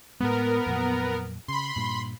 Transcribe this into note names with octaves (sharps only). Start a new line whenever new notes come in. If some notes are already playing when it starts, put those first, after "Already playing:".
A2 G#3 B3 A#4
F2 A#2 F#3
C#3 B5 C6
G2 A#2